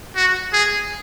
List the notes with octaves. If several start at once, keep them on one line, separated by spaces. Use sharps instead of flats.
F#4
G#4